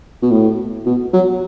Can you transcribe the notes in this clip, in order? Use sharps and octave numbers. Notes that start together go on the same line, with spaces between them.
B2
A2
B2
F#3